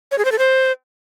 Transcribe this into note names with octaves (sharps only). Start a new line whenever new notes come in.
C#5
G#4
C5
A4
C5